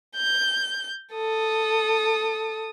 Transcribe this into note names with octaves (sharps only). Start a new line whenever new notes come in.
G6
A4 D#6